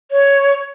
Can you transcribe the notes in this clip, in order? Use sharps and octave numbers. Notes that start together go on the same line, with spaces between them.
C#5